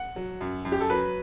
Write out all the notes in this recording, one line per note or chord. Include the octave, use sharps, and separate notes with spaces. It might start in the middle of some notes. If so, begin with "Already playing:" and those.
Already playing: F#5
F#3
F#2
F#2
G4
A4
F#3 B4